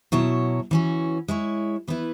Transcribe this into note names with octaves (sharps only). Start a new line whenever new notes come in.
B2 F#3 E4 C#5
E3 C#4 F#4
G#3 E4 C#5
E3 B3 E4 B4